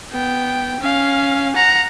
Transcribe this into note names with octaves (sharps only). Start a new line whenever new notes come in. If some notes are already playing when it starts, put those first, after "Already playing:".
B3 G5
C#4 F5
F#5 A#5